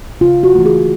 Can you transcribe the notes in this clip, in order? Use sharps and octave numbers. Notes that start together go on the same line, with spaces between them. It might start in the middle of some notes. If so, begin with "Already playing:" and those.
C#3 F4
F#4
E3 A3
G#4